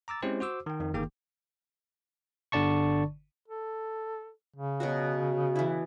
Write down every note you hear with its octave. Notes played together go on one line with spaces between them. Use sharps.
A#5 D6 E6 A6
G#3 C4 C#4 E4 G4 C5
F#4 C5 D6 E6
D#3 G5
F2 D#3
G1 D#3 A#3 G#4 G5 D6
G1 D3 D5 A5 C#6
A4
C#3
B2 F#3 F#4
E3 E4